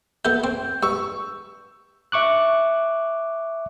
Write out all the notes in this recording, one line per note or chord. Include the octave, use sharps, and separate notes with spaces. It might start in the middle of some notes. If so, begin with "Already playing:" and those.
B3 A4 E5 G6
C4
G2 C#6 E6
E5 C#6 D6 F#6